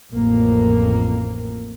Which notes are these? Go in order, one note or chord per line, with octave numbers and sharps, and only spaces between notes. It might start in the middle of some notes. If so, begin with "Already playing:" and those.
A1 F2 A#3